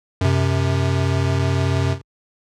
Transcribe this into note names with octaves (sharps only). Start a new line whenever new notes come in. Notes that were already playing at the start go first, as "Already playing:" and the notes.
F#2 C3